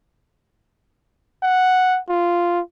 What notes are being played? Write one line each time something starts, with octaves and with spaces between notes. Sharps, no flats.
F#5
F4